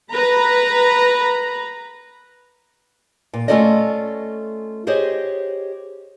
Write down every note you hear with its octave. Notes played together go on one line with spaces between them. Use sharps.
B4 A#5 B5
A#2
A3 C#4 F4 A4 D5 D#5
G4 G#4 C5 C#5 D#5